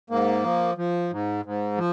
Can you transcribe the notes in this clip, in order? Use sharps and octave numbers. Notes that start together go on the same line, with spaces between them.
G#2 A#3
F3
F3
G#2
G#2
F3